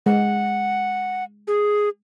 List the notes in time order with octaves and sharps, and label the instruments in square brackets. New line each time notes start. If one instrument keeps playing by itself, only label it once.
[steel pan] G#3 [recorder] F#5
[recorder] G#4